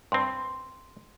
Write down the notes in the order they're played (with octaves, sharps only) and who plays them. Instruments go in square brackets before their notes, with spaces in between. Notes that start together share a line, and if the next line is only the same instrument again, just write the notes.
[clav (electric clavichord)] G2 C4 [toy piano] C6